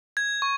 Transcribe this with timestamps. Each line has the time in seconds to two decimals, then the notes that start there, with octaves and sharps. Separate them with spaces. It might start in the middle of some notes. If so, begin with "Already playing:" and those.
0.17 G#6
0.42 C#6